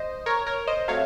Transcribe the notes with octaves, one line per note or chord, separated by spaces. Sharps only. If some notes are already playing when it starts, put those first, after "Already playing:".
Already playing: C5 D#5
A#4 C#5
A#4 C#5
C5 D#5
C3 F#3 A3 C#5 F5